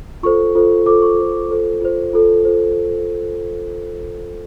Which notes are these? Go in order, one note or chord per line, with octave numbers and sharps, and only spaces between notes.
F4 A4 C5 C#6
F4 A4 C5
F4 A4 C5 D6
C#6
F4 A4 C5
F4 A4 C5
F4 A4 C5
F4 A4 C5
F4 A4 C5